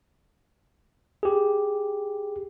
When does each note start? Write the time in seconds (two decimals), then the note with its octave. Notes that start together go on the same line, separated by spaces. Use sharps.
1.23 G4 G#4